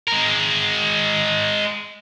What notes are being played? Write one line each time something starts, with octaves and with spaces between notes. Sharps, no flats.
G#3 A#4